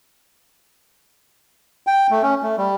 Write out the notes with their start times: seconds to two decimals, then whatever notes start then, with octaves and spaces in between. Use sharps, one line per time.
1.87 G5
2.11 A3
2.23 C#4
2.42 A3
2.58 G3